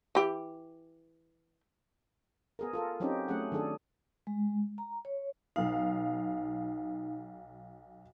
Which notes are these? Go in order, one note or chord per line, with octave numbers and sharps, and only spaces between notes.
E3 G4
B3 G#4 A#4
F4 A4 A#4
F#3 C4 C#4 D#4 G4
F#3 A3 C#4 G#4 F#5
D#3 F#3 D4 G#4 A4
G#3
A#5
C#5
B1 D#4 F5